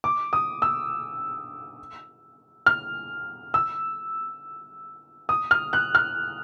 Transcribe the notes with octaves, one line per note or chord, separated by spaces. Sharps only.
D6
D#6
E6
F6
E6
D#6
F6
F#6
F6